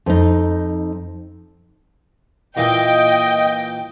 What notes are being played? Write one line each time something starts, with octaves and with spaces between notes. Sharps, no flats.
F2 D#4
A#2 E3 D#5 G5